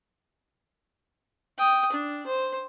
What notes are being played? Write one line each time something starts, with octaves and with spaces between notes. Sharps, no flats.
G5 D#6
D4
C5